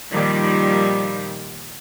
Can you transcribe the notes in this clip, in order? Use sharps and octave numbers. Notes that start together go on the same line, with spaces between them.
A#2 D#3 F3 G3